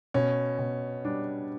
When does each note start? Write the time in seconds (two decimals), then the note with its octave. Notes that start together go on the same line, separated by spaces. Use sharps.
0.14 B2 C#4
0.59 B2
1.05 G3 D4